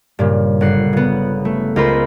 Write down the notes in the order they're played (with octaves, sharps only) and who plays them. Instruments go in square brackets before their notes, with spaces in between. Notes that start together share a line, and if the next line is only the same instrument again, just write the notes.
[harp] G2 A#2 C#3
G1 F#5 C7
C#3 B3
A3
C#2 F4 A#4 C5 B5